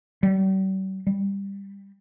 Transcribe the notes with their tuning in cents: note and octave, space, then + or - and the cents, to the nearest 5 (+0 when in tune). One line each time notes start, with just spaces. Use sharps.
G3 -45
G3 +15